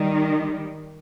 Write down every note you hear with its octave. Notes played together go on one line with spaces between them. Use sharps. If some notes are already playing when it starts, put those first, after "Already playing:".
Already playing: D#3 G3